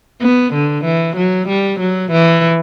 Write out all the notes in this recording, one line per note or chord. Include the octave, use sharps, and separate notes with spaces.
B3
D3
E3
F#3
G3
F#3
E3